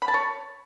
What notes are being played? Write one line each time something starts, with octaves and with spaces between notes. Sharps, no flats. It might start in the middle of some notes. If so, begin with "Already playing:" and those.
B5
A5
C#5